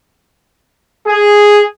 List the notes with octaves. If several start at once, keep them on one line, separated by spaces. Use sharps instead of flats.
G#4